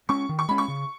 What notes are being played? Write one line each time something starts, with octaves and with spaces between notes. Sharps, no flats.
G#3 C#4 C#6
D#3
C#6
G#3 C#4 B5
C#6
C#3